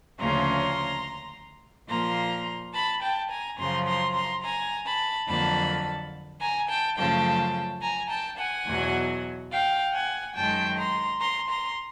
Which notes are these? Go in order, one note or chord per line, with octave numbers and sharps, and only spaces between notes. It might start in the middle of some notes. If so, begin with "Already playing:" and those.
D2 C#3 F3 A#3 C#4 A#5 C6
A#2 F3 A#3 A#5 C6
A5 B5
G5 A5
G#5 A#5
F#2 C#3 F3 A#5 C6
A#5 C6
A#5 C6
G#5 A#5
A5 B5
F2 D3 F#3 A#3 A5 B5
G#5 A#5
G5 A5
F#2 C#3 F3 A3 G5 A5
G#5 A#5
G5 A5
F#5 G#5
E2 B2 F#3
F5 G5
F#5 G#5
F#2 D#3 G#3 G5 A5
A#5 C6
A#5 C6
A#5 C6